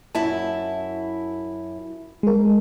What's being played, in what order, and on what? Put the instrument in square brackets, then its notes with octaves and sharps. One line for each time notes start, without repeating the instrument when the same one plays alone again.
[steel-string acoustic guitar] F#2 E4 A5
[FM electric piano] G#3 A#4